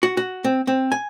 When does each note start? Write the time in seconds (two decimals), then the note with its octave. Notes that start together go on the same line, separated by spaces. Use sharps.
0.03 F#4
0.17 F#4
0.44 C4
0.67 C4
0.92 G#5